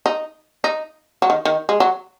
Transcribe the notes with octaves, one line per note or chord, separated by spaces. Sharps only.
D#4
D#4
F#3
D#3
D#3
G#3
F#3